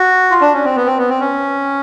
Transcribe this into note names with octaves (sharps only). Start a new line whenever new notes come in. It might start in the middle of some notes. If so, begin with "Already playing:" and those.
Already playing: F#4
F4
D4
C#4
C4
B3
C4
B3
C4
C#4